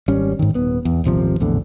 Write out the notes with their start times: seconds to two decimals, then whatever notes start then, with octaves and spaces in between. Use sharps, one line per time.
0.08 G#1 G3 C#4
0.39 G#2 D#3
0.54 D#1 B3
0.85 E2
1.04 D#1 G#1 C3 F3
1.40 A#1 E2 A2 D3